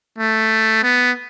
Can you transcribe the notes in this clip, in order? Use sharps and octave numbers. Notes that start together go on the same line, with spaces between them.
A3
B3